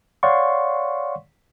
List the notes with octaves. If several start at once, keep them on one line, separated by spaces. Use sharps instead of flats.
C#5 D5 F5 F#5 C6 C#6